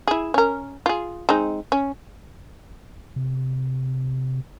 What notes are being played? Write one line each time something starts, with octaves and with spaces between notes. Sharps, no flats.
E4 G#4
C#4 A#4
F4 G#4
G#3 C4 D#4
C#4
C3